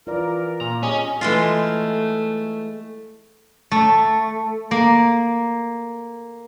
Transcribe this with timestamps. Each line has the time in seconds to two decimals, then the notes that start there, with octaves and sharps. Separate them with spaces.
0.07 E3 F4 A#4 D5
0.60 A#2 A#5
0.83 C#4 G4 G#4 D#5
1.21 E3 G#3 A3 F4
3.72 A3
4.71 A#3